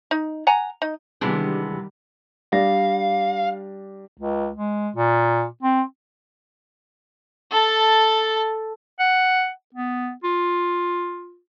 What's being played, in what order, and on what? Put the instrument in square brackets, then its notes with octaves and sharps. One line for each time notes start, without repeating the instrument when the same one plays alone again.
[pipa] D#4
F#5 G#5 A#5
D#4
[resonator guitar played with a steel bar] C3 E3 B3 [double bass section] D#3 G3 [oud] G#3 D4
[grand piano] G3 D4 A#6 [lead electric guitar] F5
[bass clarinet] C#2
G#3
A#2
C4
[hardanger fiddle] A4 A5
[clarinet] F#5
B3
F4